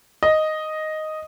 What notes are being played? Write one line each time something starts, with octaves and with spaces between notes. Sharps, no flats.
D#5